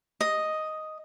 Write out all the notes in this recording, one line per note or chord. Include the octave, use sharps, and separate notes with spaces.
D#5